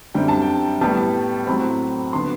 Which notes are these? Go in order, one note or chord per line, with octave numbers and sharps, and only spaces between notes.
F#2 D3 G3 C4 G5
A5
G5
A2 G3 B3 A5
A2 F#3 C4 B5
D3 F#3 B3 C6